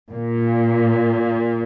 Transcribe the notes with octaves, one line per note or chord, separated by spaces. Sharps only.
A#2